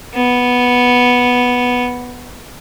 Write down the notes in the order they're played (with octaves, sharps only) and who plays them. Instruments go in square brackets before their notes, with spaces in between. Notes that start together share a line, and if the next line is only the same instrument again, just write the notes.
[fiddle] B3